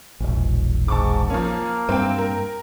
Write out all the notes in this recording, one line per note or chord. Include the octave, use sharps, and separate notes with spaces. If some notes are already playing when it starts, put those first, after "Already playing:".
E1 A#1
G#2 A5 C#6 D6
F3 A#3 C#4
G2 C4 G5
A#4